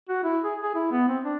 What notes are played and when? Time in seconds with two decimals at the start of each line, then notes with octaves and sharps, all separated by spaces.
0.09 F#4
0.24 E4
0.44 G#4
0.62 G#4
0.75 E4
0.92 B3
1.08 C4
1.24 D4